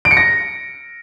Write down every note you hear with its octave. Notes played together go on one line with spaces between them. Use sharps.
D7
C#7
A#6